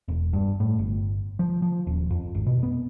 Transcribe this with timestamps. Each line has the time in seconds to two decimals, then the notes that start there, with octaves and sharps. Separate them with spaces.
0.08 E1
0.33 G2
0.60 A2
0.78 G1
1.39 F3
1.62 F3
1.87 D#1
2.10 F2
2.35 G#1
2.46 B2
2.63 B3